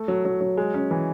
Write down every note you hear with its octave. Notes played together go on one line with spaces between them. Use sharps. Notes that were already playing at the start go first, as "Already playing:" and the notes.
Already playing: A3
F#3
F#3
F#3
G#3
C#4
E3